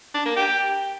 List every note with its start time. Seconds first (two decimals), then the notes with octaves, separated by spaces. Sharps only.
0.14 D4
0.25 A#3
0.36 G4